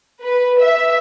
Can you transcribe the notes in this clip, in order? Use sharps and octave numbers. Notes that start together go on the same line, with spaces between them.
B4
E5